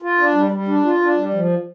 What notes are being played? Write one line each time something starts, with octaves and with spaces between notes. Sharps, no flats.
F4
D4
G3
G3
D4
F4
D4
G3
F3